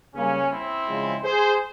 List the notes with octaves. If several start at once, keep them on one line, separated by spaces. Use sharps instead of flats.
C#3 G3 A#3 C#4
C4 E4
C#3 F3 G#3
G#4 C5